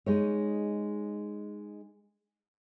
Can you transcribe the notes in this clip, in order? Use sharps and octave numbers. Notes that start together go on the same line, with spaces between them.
G#3 D#4 C#5